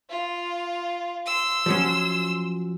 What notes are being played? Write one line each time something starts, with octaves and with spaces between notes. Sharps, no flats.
F4
C6 E6
F3 F#3 C#4